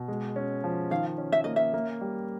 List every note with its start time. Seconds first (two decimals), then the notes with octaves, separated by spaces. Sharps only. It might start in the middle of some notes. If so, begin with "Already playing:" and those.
Already playing: B2
0.08 G#3
0.36 C#4
0.64 F3
0.91 D#3 F5
1.18 C#4
1.32 E5
1.44 A#3 D#5
1.56 E5
1.74 A#3
2.01 G3